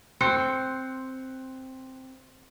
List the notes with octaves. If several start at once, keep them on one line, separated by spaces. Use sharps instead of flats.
C4 C6 F#6 C#7